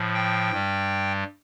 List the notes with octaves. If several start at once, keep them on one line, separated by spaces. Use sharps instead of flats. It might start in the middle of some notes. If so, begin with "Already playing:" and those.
Already playing: A2 F3
G5
G2 G3